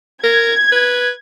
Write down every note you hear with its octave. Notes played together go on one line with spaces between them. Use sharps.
A#4 G#6
B4